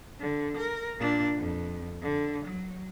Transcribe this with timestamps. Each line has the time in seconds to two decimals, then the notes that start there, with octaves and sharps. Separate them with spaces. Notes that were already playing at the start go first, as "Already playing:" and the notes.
0.20 D3
0.57 A#4
1.00 A#2 D4
1.37 F2
2.02 D3
2.46 F#3